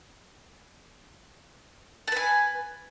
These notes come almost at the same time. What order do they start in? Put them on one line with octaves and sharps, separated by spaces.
A5 B4 G#5